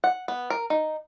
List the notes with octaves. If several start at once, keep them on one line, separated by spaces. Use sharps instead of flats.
F#5
B3
A#4
D#4